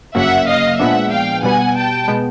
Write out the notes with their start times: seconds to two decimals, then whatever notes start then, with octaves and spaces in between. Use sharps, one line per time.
0.15 G1 F#2 C#3 F#3 A#3 E5 F#5
0.48 D#5 F5
0.79 A#2 F3 G#3 B3 D4 E5 F#5
1.11 F5 G5
1.43 B2 G3 B3 F#5 G#5
1.76 G5 A5
2.08 B2 G#3 B3